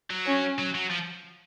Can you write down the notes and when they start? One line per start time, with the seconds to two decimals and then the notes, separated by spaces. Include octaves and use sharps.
0.10 F#3
0.26 C#4
0.58 F#3
0.74 F#3
0.90 F3